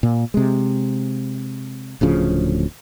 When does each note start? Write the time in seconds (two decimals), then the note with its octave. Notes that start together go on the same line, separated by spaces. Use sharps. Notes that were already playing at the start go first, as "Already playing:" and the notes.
0.03 A#2
0.34 C3 G#3
2.01 D1 D2 C#3 F3